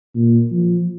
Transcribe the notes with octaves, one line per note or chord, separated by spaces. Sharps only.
A#2
F3